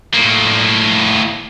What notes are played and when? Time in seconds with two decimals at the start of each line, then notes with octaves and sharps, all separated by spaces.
0.14 A2 A#3